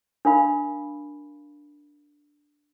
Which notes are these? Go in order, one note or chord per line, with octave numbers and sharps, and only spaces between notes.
D4 A#4 F5 B5